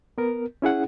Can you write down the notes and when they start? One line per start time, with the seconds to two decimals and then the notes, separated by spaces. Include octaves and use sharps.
0.18 B3 A#4
0.62 C#4 E4 G#4 F#5